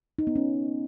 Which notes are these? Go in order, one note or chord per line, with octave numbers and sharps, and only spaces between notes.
D#4
B3
C#4